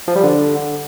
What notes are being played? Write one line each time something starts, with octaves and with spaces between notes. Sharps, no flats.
F3
G3
D3